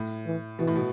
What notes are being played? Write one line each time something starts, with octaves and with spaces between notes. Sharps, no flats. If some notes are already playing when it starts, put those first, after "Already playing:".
Already playing: A2
E3
B2 E3
A2
B2